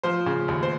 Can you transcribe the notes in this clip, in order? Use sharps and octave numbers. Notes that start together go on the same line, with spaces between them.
F3 C5
C#3
D#2
C5